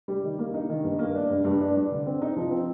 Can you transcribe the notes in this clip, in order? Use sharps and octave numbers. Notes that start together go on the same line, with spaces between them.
G3
D#3
A#3
D#4
D#3
G2
A#3
D4
G2
G2
D4
D4
D3
C4
D#4
F3
C4